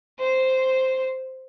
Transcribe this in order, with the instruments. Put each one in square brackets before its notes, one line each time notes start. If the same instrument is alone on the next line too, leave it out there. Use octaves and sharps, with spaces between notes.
[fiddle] C5